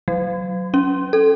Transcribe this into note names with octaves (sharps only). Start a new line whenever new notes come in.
F#3
C#4
A4